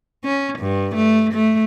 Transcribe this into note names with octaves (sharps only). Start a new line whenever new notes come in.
C#4
G2
A3
A3